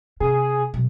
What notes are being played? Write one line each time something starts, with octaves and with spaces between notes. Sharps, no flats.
C3 G#4
B1